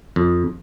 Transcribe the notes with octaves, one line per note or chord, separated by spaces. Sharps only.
F2